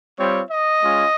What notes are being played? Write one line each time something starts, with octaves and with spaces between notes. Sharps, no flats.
G3 C4 F4 C#5
D#5
G#3 C#4 F4